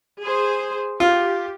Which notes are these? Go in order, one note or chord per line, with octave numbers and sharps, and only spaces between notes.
G#4 C5
F4 G4